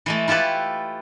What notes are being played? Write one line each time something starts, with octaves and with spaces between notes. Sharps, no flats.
E3 G#3 A3
E4 F4 G4 A4 B4